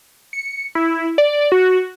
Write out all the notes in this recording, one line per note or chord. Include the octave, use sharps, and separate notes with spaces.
C#7
E4
D5
F#4